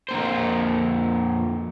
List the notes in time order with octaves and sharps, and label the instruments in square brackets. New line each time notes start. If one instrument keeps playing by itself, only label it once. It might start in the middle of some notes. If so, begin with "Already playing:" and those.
[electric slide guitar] F2 A#3 C5